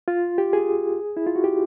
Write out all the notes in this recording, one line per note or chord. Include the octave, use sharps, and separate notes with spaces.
F4
G4
G#4
E4
F4
F#4
G4